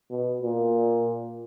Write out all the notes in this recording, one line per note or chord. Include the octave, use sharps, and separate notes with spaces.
B2
A#2